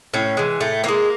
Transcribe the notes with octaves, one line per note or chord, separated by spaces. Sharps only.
A2 C#4
E3 G#3
A2 A3
E3 G#3 A#3